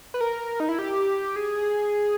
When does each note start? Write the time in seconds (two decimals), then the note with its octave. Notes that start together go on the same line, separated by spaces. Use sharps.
0.14 B4
0.21 A#4
0.60 D#4
0.69 E4
0.79 G4
1.36 G#4